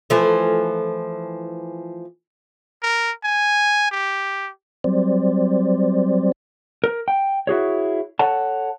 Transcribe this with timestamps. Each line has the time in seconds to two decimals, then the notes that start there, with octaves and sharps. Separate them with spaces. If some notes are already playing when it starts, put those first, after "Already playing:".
0.10 E3 F3 A3
2.83 A#4
3.24 G#5
3.91 G4
4.84 F#3 G3 C4 C5 D5
6.84 A#4
7.08 G5
7.47 E4 F#4 G#4 C#5
8.19 A4 C#5 F#5 A5